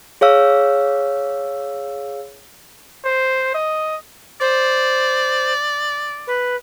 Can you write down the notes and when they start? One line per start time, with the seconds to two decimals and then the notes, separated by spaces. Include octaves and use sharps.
0.21 G#4 C#5 F5 E6
3.05 C5
3.55 D#5
4.41 C5 D5
6.27 B4